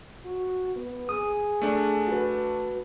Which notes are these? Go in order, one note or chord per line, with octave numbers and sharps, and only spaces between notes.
F#4
B3
G#4 D#6
A3 D4
F#4 B4